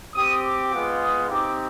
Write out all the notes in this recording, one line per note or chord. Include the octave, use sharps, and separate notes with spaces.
C4 G4 D#6
D6
G#3 B3 F4
D#6
C4 D#4 G4 D6